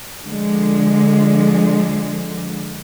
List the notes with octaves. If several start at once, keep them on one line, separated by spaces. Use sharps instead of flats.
D3 F3 G#3